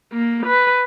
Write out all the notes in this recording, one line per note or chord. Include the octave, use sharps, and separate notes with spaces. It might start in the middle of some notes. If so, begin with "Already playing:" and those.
A#3
B4